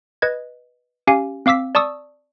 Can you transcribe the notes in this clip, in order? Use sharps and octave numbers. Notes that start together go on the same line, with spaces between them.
B4 D#5 G#6
C#4 G4 F5 G#5
C4 F5 D6 E6 B6
D5 A5 C#6 D#6 E6